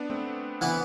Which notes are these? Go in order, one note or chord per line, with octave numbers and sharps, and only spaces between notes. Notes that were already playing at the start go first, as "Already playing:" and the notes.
Already playing: B3 D4
A3 C4
E3 B3 E4